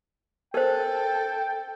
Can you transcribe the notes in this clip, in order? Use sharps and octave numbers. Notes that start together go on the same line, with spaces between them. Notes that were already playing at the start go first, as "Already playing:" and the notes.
A4 A#4 C5 G5